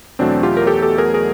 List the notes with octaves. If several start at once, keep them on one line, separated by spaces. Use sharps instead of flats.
E2 B2 F#3 A3 C4 D4
F4 G4
A#4
G4 A4
G4 A4
G#4 A#4
G#4 A#4